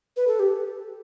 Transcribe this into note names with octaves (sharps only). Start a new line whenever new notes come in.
B4
A4
G4